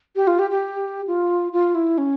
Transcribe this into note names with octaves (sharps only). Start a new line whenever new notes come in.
G4
F4
G4
G4
F4
F4
E4
C#4